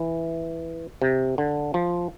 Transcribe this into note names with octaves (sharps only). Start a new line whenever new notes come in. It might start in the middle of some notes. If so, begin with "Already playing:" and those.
Already playing: E3
C3
D3
F3